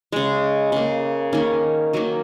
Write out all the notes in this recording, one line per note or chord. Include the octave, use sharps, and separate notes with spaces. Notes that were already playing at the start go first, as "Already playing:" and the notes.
C#3 G#3
C#3 A#3
D#3 A#3 C#4
D#3 F#3 A#3